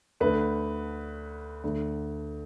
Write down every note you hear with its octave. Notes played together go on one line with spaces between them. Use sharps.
D2 D3 B4
D2 D3